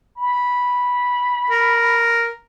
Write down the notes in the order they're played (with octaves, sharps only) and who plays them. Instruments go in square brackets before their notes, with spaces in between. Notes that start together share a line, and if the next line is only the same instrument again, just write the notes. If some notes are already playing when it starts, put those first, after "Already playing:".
[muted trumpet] B5
[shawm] A#4